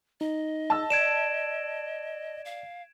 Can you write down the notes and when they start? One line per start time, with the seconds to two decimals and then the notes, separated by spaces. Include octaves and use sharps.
0.21 D#4 D#5
0.70 A5 E6
0.90 D5 G#6 D7 E7
2.45 F5